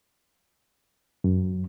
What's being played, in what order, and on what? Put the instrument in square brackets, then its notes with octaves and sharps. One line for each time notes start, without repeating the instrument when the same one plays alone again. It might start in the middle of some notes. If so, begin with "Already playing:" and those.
[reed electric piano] F#2